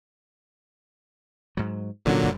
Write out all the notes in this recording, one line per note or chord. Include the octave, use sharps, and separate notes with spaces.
G#2 F#3
F1 A#2 D3 E3 F#3 C#4
F1 F#2 G3